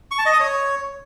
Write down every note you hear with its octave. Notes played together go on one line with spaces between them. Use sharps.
C#6
A5
D#5
D#6
C#5